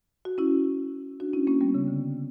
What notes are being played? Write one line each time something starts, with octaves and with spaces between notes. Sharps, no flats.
F#4
C#4 E4
D4 F#4
C#4 E4
A#3 C#4
G3 B3
C#3
D3